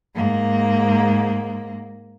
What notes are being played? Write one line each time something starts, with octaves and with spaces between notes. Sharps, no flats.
G#2 A#3